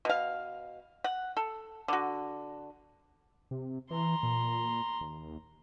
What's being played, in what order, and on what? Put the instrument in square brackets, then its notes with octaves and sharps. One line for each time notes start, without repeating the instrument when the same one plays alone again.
[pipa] B2 F5
F#5
A4
D3 F#4
[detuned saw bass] C3
[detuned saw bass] E3 [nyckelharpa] A#5 C6
[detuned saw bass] A#2
D#2